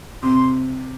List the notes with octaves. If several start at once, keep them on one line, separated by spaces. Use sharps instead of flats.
C3 C6